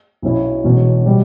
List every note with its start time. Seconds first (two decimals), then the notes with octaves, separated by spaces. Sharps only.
0.22 B1 B2 F#3 C#4 E4
0.64 E1 E2 B2 F#3 C#4
1.06 B2 G3